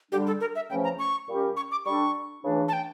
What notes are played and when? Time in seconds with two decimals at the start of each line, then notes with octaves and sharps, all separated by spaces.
0.12 D3 G3 D4 G4
0.27 A4
0.41 A#4
0.56 E5
0.70 E2 C#3 F3 A3 C#4 G5
0.84 A#5
0.99 C#6
1.28 A#2 G3 C#4 G4 A#4
1.57 C#6
1.71 D6
1.85 G3 D4 A4 C#6
2.43 C#2 C#3 E3 A3 D4
2.68 A5
2.73 G5